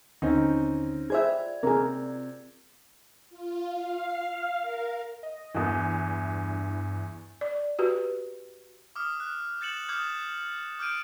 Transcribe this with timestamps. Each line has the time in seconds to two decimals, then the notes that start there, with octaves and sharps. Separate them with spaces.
0.22 D#2 D3 C4 C#4 D#4
1.10 F4 G#4 C5 D5 E5 G#6
1.63 C3 G#4 A#4
3.30 F4
3.73 F5
4.60 A#4
5.23 D#5
5.54 E2 G2 E3
7.41 D5
7.79 F#4 G4 B4
8.96 D6 D#6 F6
9.20 F#6
9.61 G6 A6 C#7 E7 F#7
9.89 D6 D#6 F6 G6 G#6 F#7
10.79 D6 F6 G6 D7 D#7